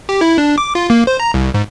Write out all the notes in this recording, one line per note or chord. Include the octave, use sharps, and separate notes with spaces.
G4
E4
D4
D6
F4
A#3
C5
A#5
C2
G#2